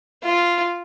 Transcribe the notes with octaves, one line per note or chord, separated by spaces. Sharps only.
F4